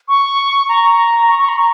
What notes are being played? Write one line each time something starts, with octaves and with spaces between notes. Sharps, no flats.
C#6
A#5
C#6
C#6
A#5